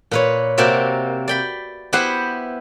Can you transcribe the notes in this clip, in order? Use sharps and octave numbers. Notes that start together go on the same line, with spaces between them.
A#2 B4 C#5
C3 A#3 C4 F#4 D5 E5
D5 G5 B5
B3 E4 G4 B4 C5 F#5